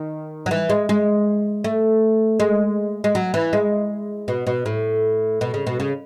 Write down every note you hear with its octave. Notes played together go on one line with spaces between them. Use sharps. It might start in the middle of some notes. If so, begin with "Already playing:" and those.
Already playing: D#3
F#3
E3
G#3
G#3
A3
G#3
G#3
F#3
E3
G#3
B2
B2
A2
B2
C#3
B2
C#3